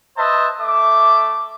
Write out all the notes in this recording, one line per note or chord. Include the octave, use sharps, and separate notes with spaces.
B4 C5 D#5 E5 A5
A3 E5 D6